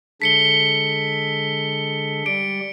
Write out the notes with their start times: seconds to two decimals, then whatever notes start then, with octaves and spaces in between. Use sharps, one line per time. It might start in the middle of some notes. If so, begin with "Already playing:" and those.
0.22 D3 G#3 A4 B6 C#7 G7
2.26 G3 D5 D7